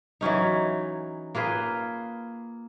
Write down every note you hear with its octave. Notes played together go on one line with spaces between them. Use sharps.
E3 F#3 C#4 D#4
A#3 F4 G#4 B4